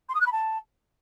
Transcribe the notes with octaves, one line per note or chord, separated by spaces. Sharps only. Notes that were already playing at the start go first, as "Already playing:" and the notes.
C6
D#6
F#6
B5
A5